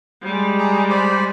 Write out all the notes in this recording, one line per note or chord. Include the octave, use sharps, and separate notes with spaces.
G3 G#3
G#4 A#5
C5 D5 B5